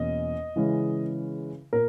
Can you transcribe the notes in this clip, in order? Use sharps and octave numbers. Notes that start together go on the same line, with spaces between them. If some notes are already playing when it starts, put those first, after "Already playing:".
Already playing: E2 B2 A#3 C#4 D#5
C#3 E3 G#3 C#4
A#2 A#4